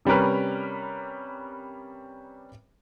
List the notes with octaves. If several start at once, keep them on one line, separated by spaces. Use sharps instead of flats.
C3 G3 C#4 A#4 B4